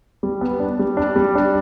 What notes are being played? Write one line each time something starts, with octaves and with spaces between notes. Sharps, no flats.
G3
B3
D4
G3
D4
G3
D4